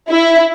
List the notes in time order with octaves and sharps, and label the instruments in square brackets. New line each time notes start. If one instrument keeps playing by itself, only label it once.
[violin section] E4